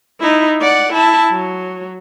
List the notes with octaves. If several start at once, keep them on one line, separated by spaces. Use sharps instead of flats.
D#4 E4
D5 F#5
E4 A5
F#3